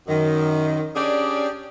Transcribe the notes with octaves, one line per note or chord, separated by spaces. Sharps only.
F#2 D#3
C#4 D4 G4 G#4 D5